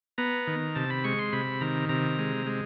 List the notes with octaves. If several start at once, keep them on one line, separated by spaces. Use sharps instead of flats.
B3 A#5
D#3
C3 A5
B5
G#3 C#6
C6
C3 B5
D#3 A#5
C3 A#5
G#3
G#3